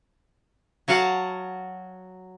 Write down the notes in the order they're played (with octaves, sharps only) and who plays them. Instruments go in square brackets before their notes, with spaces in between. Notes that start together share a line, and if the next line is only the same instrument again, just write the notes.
[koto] F#3 F#4 F5 F#5 A5